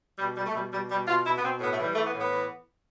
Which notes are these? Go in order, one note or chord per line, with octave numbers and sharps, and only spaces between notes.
B2 G3
B2 G3
A3
B2 G3
B2 G3
B2 G3
B2 F4
B2 E4
B3
B2 C4
A2 B3
A3
E3
G3
E3 A3
B3
A2
B3
E3